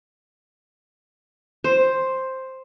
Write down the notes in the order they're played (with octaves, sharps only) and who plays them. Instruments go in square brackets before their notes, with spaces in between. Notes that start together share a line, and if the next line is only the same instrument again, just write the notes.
[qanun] C5